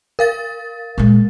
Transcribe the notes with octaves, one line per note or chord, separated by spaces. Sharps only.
A#4 F5 A6
A#2 G#3